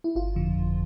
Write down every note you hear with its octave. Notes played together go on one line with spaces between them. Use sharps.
E4
G1 F4
F2 D3 F3
G1